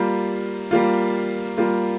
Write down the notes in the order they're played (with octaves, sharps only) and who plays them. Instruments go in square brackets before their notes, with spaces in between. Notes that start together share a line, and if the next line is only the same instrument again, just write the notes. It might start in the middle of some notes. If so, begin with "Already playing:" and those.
Already playing: [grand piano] G3 A#3 F4
G3 A#3 F4
G3 A#3 F4